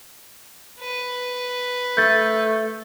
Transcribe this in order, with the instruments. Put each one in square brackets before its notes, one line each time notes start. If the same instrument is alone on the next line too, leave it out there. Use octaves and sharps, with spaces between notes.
[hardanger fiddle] B4
[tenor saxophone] A3 [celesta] G6 A6